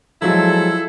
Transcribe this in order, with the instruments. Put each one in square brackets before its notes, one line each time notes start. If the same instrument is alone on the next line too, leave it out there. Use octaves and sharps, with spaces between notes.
[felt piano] F3 F#3 G#3 [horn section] E4 A4